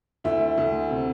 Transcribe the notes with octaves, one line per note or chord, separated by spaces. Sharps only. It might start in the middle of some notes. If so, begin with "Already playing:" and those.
D2 E4 E5
D2
C3